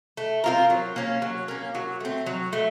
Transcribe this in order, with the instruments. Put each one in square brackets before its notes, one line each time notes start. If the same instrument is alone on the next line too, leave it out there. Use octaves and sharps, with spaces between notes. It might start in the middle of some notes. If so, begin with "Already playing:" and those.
[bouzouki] A3
C4 F4 A#4
F#3
A#3 C#4
F#3
A#3 C#4
F#3
A3 C4
F#3
A3